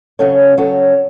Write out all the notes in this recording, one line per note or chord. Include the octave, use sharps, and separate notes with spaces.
C#3 F#3 C#4 A4 C#5
C#3 F#3 C#4 A4 C#5